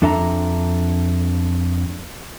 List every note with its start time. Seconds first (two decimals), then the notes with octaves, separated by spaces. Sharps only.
0.02 F2 D4 A4 E5 G#5 A#5